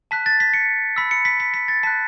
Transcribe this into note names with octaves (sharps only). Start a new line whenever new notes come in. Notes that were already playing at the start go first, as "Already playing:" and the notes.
A5 F#6 B6
A6
B6
C#7
B5 E6 B6
C#7
B6
B6
B6
A6
A5 F#6 B6